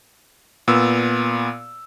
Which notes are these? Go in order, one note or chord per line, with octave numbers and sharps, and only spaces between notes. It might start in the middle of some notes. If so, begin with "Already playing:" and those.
A#2 B3 E6